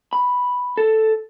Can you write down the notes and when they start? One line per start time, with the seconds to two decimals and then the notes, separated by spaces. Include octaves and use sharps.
0.13 B5
0.77 A4